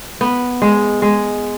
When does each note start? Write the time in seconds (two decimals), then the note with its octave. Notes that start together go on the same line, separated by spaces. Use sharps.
0.21 B3
0.62 G#3
1.02 G#3